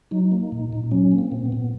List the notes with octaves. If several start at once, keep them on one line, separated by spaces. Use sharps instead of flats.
F#3 D#4
A#3
A#2
A#2
F#3 C#4
A#3
C4
A#2
B3
A#2